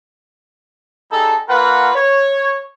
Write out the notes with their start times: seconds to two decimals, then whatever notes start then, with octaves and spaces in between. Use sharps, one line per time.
1.12 G3 D#4 G#4 A4
1.49 A#3 F4 A#4 B4 F#5
1.95 C#5